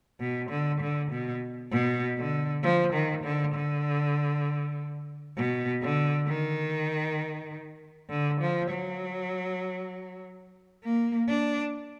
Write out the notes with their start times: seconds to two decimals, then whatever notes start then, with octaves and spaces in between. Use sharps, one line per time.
0.20 B2
0.50 D3
0.81 D3
1.11 B2
1.72 B2
2.17 D3
2.63 F3
2.93 D#3
3.24 D3
3.55 D3
5.37 B2
5.82 D3
6.28 D#3
8.09 D3
8.41 F3
8.71 F#3
10.84 A#3
11.28 D4